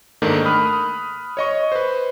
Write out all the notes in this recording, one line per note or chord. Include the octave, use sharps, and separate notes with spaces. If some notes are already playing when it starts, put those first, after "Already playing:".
G#2 D#3 A3 A#3 D4
B5 D#6 F6 F#6
C#5 D#5 C#6
B4 C5